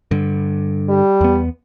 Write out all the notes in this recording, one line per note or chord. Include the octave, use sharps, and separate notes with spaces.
G2 D3
G3
E2 B3